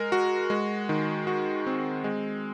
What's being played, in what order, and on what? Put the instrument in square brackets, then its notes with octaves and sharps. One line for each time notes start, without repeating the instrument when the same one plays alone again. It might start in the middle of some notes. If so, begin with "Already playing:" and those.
Already playing: [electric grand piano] G#3 A#4
F#4
G#3
D#3
F#4
C4
G#3